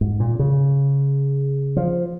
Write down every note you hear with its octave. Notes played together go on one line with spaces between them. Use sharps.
G#2
A#2
C#3
F3